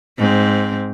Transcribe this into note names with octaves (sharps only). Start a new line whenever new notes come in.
G#2 C4